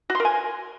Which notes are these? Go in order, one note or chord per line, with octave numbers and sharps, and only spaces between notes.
F#4
C6
A#4
G#5